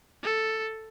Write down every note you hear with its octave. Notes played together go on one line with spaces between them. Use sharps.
A4